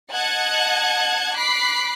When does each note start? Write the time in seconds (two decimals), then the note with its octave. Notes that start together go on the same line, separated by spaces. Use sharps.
0.12 D#5 F#5 A5 F#6 G#6 C#7
1.35 B5 D6 F#6 B6 C7